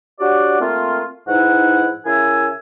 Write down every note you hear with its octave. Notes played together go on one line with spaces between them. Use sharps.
D4 F#4 G4 C#5 D5 F#5
A3 A#3 C4 F4
G#2 E3 D#4 E4 F#5
C#3 E4 A#4 E5 G#5